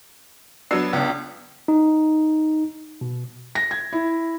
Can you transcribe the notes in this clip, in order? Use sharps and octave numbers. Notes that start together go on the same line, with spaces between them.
F#3 B3 D4 E6 C7
C#2 B3 D4
D#4
B2
A#6
G#6
E4